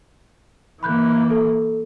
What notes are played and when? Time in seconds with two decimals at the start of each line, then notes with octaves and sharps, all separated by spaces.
0.83 E3 A#3 B5 F#6 G6
1.30 A4